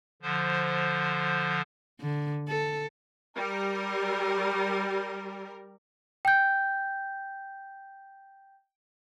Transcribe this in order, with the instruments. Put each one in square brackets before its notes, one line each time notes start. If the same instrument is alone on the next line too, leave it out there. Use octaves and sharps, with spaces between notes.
[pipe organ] D3 F3 C5
[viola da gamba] D3
A4
[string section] G3 A#4
[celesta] G5 G6